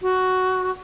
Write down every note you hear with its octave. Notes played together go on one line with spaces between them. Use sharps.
F#4